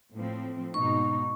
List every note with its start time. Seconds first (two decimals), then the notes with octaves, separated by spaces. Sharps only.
0.13 A2 F3 C4
0.74 G#2 B2 D#4 C#6